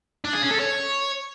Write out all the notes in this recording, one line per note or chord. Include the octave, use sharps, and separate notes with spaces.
D4
G#4
C#4
A4
C#5